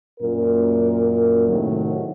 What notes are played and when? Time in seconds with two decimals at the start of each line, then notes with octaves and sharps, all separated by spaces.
0.20 F#2 A#2 A#4
1.48 A2 C3 D#3 F#3